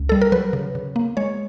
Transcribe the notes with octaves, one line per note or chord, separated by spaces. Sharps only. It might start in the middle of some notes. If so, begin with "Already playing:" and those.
Already playing: C#2
G3 A4
A#4
F#3 B4
C#3
C#3
A#3
G#3 C#5